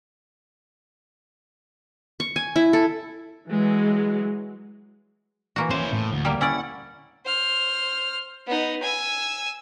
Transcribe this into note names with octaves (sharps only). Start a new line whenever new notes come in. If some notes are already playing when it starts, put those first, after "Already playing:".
C#6
G#5
E4
A4
E3 F#3 G#3
E3 A#3 F#4
C#4 E4 C5
A2
D2
G3 A#3
C#4 E4 D5 F#5
C5 F6
B3 D#4
G#5 E6